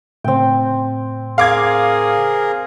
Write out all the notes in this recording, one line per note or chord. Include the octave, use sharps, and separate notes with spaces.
A2 C#3 C4 C5 G5
G#4 A#4 F5 D6 G#6